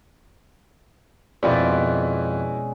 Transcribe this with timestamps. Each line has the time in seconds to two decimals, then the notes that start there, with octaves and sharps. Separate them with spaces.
1.43 F2 B2 G#3 C#4 E4 F#4 B4 D5